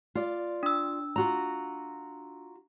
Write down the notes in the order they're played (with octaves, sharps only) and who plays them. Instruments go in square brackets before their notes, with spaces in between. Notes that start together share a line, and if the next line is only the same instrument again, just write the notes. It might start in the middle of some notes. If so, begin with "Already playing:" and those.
[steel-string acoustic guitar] F4 D5
[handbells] D4 E6
[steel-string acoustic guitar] F4 F#4 A#5